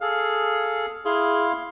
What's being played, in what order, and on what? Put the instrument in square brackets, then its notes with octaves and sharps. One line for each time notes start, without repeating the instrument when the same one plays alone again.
[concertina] G#4 A4 [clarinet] F5
[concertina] E4 F5 C6 [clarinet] G#4